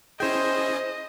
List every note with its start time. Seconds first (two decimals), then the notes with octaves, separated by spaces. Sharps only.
0.20 C#4 E4 G#4 C5 D#5 G5